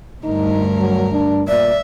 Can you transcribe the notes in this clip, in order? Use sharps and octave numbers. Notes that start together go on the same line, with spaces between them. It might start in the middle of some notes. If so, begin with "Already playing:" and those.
D2 G2 D#4 A#4
F#3
D4
A#2 D5 E5